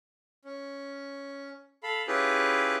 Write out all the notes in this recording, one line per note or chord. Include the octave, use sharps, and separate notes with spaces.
C#4
A4 F5 B5
C#4 E4 F4 G4 G#4 B4